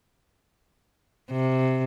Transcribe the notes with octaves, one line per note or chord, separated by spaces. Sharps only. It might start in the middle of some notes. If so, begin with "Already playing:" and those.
C3